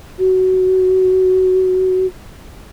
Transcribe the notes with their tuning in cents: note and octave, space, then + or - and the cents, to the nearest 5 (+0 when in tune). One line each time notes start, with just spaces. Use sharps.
F#4 +10